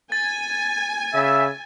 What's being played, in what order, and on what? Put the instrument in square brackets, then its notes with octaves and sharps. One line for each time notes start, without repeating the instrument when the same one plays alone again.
[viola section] G#5 [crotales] A6
[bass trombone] C#3 [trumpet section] E5